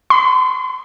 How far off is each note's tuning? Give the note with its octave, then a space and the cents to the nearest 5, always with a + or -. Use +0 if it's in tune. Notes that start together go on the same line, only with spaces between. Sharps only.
C6 -45